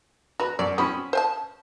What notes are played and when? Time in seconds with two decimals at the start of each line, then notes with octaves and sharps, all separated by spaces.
0.40 F#4 B4 A#5
0.59 F#2 D5
0.78 F#3 C4 C#4 B5 D#6
1.13 C5 G#5 A5